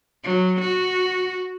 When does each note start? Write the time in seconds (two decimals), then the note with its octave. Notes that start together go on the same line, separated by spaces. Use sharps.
0.24 F#3
0.61 F#4